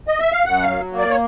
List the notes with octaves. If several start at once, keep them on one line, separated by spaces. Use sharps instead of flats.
D#5
E5
F5
F#2 F#5
F5
F#3
A#3
D5
C#5